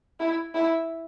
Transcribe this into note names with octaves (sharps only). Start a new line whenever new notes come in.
E4
E4